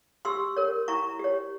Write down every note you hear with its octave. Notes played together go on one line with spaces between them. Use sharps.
G4 C6 E6
A#4 C#5
E4 A#5 C#6
G4 C#5